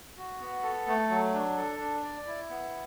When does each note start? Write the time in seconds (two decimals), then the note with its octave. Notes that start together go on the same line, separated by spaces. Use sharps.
0.17 F#4
0.40 B3
0.63 A4
0.87 A3
1.10 F#3
1.33 D4
1.57 A4
1.80 D4
2.03 D5
2.26 E4
2.50 B3